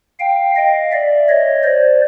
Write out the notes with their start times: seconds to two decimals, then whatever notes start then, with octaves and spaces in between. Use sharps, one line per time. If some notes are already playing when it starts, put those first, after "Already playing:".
0.20 F5 G5
0.55 D#5 F5
0.92 D5 E5
1.29 C#5 D#5
1.64 C5 D5